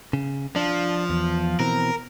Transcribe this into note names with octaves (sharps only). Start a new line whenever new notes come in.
C#3
F3 D4
E2
B2 E3 C4 A#4